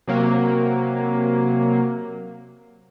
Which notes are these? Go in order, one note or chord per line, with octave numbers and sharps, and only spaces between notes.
C3 F#3 A#3